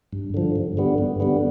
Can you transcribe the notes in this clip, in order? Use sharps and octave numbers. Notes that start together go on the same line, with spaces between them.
G2
D3 F3
G2
D3 G3 B3
G2
D3 G3 B3